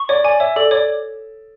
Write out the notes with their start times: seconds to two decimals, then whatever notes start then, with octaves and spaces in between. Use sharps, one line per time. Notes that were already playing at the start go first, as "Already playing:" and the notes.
Already playing: C#6
0.09 C#5 D5
0.24 D5 G#5
0.40 C#5 E5
0.56 A4 D5
0.71 C#5 D5